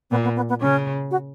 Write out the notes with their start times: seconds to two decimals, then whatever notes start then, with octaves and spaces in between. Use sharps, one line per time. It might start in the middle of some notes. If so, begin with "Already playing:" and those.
0.11 A#2 B3
0.24 B3
0.36 B3
0.49 B3
0.60 C#3 C#4
1.11 F#4